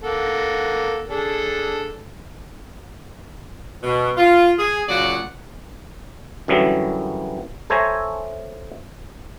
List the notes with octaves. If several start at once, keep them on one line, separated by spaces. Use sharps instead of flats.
A#3 A4 F#5
D4 G#4 A4
B2
F4
G#4
A#2 C#3 F#3 F#4 D5 F#5
F#2 D3 E3 F#3 G3
A4 C5 C#5 E5 G#5 A#5